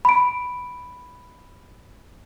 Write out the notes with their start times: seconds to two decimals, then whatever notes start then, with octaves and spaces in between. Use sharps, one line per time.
0.05 B5 D7